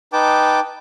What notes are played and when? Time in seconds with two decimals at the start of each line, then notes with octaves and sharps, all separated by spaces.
0.13 D#4 B4 G5 A5 D6